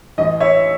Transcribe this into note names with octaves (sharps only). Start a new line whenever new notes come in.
A1 D#5
C#5 E5